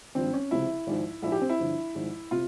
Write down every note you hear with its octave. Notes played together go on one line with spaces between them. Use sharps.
G#1 G2 F3 C4
C#4
C#2 C3 F3 E4
G#1 G#2 F3
A#1 G#2 F3 E4
G4
C4
E4
G1 G2 F3
G#1 G#2 F3
C3 F4